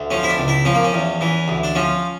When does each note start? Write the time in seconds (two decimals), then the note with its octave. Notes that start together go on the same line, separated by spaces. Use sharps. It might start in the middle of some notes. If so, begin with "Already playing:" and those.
Already playing: D2
0.11 F3 C#4
0.23 E4
0.29 D4
0.38 C#2
0.48 E4
0.65 F3 C#4
0.75 A#3
0.84 C#4
0.93 E2
1.21 E3
1.48 D2
1.64 D4
1.75 F3 C#4